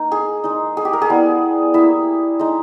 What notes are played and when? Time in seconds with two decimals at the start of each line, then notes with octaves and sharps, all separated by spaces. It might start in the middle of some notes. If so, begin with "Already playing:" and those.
Already playing: A#3 D#4
0.12 G#4
0.44 G#3 D#4
0.77 G#4
0.85 G4
0.93 A#4
1.02 G#4
1.09 G3 B3 E4
1.74 A#3 E4 E5
2.39 G#3 D#4